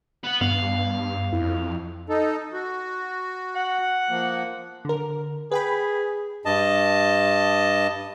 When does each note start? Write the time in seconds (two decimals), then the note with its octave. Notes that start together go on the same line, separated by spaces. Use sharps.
0.24 B3 F#5
0.41 G2 B3 F5
1.33 F2 E4
2.09 D#4 A4
2.53 F#4
3.56 F#5
4.10 F3 A#3
4.85 D3 A#4
5.52 G#4 B4 G5 B5
6.45 G2 D#5 A5